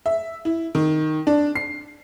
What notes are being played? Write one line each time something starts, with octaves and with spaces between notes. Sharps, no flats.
E5
E4
D#3
D4
C7